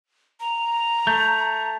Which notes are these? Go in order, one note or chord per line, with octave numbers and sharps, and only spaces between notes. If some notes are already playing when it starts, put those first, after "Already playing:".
A#5
A3 G6